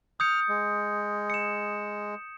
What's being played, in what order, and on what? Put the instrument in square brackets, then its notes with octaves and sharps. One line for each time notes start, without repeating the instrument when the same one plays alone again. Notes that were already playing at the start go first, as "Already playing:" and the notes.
[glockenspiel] D#6 G6 C#7 [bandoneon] F6
[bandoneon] G#3
[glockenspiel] C#7 E7